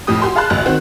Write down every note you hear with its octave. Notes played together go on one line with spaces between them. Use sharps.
F2 A2 G4 D#6
F#4 G4 G#5 C6
G#4 F5 A5 B5 C6 F#6
A1 D2 F#6
D#3 C4 F#4